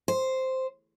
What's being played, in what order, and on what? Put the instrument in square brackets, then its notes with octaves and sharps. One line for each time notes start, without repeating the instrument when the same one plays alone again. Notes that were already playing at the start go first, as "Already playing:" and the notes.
[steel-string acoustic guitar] C5